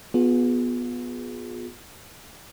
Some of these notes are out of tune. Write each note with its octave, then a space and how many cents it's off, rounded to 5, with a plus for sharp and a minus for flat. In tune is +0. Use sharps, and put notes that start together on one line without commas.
B3 +0 F4 +35 G#4 +0